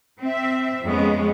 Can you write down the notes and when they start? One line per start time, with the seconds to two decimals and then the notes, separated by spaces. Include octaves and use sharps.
0.19 C4 E5
0.86 F2 G#3 B3 C#4